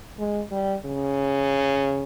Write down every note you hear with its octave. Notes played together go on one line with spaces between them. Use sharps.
G#3
G3
C#3